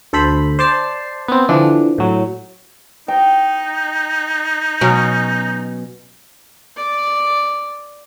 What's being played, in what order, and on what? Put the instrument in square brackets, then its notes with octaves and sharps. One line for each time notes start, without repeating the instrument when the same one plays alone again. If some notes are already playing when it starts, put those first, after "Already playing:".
[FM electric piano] D2 A4 C5 B5
C5 D5 A5 C7
B3 C4
D3 E3 F3 D4
A2 F#3
[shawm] D#4 [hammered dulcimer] G5
[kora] B2 F#3 C#4
[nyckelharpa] D5